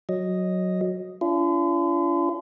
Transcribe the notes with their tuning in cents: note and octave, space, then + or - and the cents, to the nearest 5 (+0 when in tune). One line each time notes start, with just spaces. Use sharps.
F#3 -10 D#5 +0
D4 -45 F4 -45